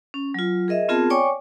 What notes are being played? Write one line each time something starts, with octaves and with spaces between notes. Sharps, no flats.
C#4
F#3 F4
G#4 A#4 D#5 E5
B3 C4 F4 G#4 A#4 A5
C#5 D5 G5 G#5 C#6 D6